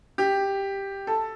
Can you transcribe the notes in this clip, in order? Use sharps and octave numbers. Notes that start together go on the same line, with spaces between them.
G4
A4